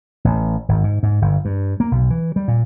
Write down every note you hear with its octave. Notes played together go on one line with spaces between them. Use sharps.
A1
G#1
G#2
G#2
G1
G2
A#3
B1
E3
G3
A#2